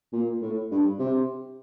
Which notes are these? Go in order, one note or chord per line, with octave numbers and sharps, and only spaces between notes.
A#2
A2
G2
C3